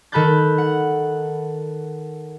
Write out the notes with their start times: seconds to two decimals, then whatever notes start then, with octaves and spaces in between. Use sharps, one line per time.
0.12 D#3 A4 B5 F#6 G6 A6
0.58 F#5